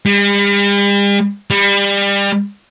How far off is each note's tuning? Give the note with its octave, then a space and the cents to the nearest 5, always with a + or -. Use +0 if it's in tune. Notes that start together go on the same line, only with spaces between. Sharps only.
G3 +45
G3 +30